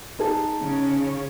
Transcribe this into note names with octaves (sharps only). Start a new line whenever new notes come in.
D#4 G#4 A5
C#3 C#4